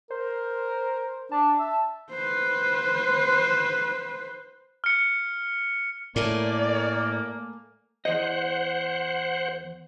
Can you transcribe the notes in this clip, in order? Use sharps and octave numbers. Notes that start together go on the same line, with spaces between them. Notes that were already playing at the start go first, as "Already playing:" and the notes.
A#4 C5
D4 A5
E5
B4 C5
F6 C#7
A2 A3 A#3 A#4 D5 G#5
E2 C5 D#5 F#5